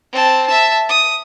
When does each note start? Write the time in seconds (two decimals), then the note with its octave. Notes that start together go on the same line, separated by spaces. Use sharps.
0.12 C4 A5
0.47 E5 A5
0.89 D#6